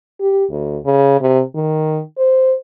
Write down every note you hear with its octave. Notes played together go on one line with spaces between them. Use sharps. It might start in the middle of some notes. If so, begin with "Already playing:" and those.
G4
D2
C#3
C3
D#3
C5